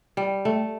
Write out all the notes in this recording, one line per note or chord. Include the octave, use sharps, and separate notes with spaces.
G3
A3